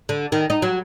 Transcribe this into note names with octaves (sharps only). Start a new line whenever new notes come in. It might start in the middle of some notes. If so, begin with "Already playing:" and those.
D3
D#3
D#4
F#3